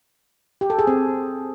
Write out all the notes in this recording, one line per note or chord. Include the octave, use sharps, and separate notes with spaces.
G4
A4
G#4
C4